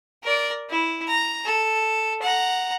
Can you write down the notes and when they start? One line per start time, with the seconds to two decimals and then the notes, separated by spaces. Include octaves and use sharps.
0.23 A#4 D5
0.69 E4
1.08 A#5
1.45 A4
2.22 F#5 A#5